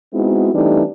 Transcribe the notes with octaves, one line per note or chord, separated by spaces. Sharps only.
G#3 B3 C4 D#4 E4 F#4
E3 G3 A3 C4 D4 D#4